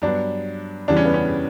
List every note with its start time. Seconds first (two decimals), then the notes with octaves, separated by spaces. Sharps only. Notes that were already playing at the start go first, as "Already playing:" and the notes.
0.02 G2 F#3 B3 D4
0.88 E2 C#3 E3 G3 D4
0.96 C#4
1.05 B3
1.14 C#4